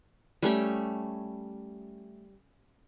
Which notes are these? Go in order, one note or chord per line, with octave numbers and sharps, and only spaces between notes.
G3 A3 C#4 G4